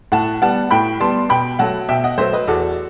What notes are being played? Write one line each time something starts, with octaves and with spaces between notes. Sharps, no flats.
A2 F#5 A5
G3 B3 F#5 A5
A2 G5 B5
G3 B3 A5 C6
B2 G5 B5
F#3 A3 F#5 A5
B2 E5 G5
D#5 F#5
F#3 A3 C5 E5
B4 D#5
E2 F#4 A4